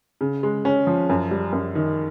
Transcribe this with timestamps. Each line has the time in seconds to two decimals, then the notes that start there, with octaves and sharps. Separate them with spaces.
0.21 C#3
0.43 G#3
0.65 C#4
0.87 F3
1.10 F#2
1.31 G3
1.53 F#2
1.75 D#3